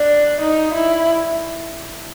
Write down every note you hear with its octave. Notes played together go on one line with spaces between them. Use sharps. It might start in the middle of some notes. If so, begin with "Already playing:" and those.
Already playing: D4
D#4
E4